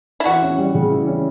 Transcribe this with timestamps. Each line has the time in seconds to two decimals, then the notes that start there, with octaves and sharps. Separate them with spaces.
0.20 E4
0.25 E3 F#4
0.42 C#4
0.58 G3
0.75 C#3
0.91 E3
1.07 C#4